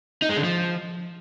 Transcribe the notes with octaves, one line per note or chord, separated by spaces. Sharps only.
D#4
G#3
D3
F3